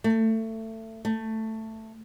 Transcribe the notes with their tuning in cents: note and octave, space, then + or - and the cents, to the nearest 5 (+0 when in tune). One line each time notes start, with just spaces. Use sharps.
A3 +20
A3 +10